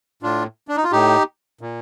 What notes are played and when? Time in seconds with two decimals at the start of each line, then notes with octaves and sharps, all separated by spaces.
0.22 A2 D4 F4
0.68 D4
0.76 D#4
0.84 F4
0.92 A2 D#4 G4
1.61 A#2